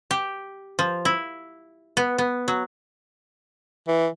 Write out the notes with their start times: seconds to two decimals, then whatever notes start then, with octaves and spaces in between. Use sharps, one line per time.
0.11 G4
0.79 F3
1.05 E4
1.97 B3
2.18 B3
2.48 F#3
3.88 E3